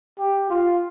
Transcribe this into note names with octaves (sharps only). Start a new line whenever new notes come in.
G4
F4